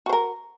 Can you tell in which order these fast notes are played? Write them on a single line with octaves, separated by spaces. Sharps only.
F#4 C5 A#4